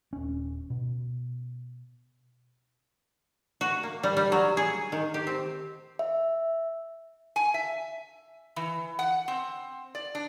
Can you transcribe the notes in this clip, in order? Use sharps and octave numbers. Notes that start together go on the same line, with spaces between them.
D#1 C#4
B2
F#4
A#3
G3
G3
F#3
G#4
D#3
G4
C4
E5
G#5
E5
E3
F#5
C4
D5
D4